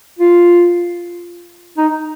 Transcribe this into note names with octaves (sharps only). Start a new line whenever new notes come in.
F4
D#4